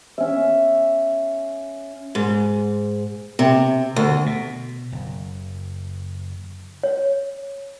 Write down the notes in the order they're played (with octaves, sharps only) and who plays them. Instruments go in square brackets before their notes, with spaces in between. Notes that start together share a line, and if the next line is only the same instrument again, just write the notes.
[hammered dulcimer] C#4 E5
[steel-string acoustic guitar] G#2
C3
D2
[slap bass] B2
F#1
[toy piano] C#5